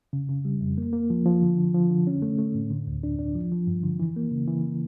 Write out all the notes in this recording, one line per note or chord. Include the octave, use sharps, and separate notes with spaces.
C#3
C#3
G3
F2
A#3
A#3
F3
F3
D3
D3
F3
D3
C#4
A3
A3
A2
D3
D2
D4
D4
F3
F3
G2
D3
E3
A#3
C#3
E3